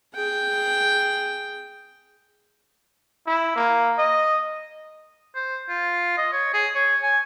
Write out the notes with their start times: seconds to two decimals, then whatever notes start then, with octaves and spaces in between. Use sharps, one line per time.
0.14 G#4 G5
3.27 E4
3.56 A#3
3.98 D#5
5.35 C5
5.69 F4
6.17 D#5
6.32 C#5
6.53 G#4
6.75 C#5
7.03 G#5